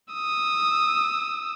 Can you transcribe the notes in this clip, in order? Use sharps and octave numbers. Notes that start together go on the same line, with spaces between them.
D#6 E6